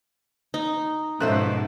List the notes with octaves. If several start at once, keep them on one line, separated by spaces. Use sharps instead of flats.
D#4
G#2 B2 F3 C#4 A4 C5 E5 F#6